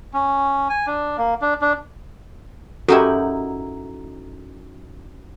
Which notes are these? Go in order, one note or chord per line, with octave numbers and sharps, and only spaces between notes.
C#4
G#5
D4
A#3
D4
D4
F#2 D#4 E4 F#4 G4 A4